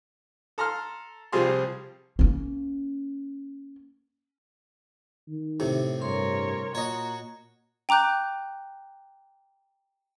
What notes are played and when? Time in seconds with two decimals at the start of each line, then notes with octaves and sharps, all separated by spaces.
0.58 A4 A#5 C6 F6
1.32 C2 F3 G3 F4 G#4 C6
2.19 A#3 C#4
5.28 D#3
5.60 A2 C3 G4
6.02 G2 A#4 C#5 C6
6.75 A#2 F#4 C#5 D#5 A#5
7.89 G5 A#5 D6 F#6 G6